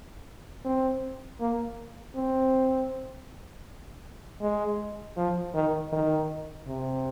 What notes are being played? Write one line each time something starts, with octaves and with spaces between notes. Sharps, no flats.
C4
A#3
C4
G#3
F3
D#3
D#3
C3